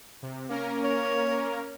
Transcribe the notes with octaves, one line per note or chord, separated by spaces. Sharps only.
C3
A#3 C#4 A#4
C#5